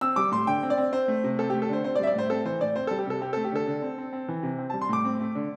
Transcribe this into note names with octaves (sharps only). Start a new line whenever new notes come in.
C4 E6
G3 D6
A2 C6
D3 G5
C4
D5
C4
C4 C5
A3
C3
C4 A4
G4
A3
A4
D3 C5
C4 C5
D5
G3 E5
D5
A2 C5
C4 A4
E3 C5
A2 D5
C4 C5
A4
G3
G4
C3 A4
C4 G4
A4
A3
G4
D3 A4
D3
C4
C4
C4
E3
C3
C4
A5
G3
C6
A2 D6
C4
A3
D3